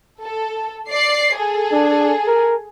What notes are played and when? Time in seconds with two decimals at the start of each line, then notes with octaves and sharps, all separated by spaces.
0.22 A4
0.90 D5 C7
1.36 G#4 A4
1.72 D4
2.28 A#4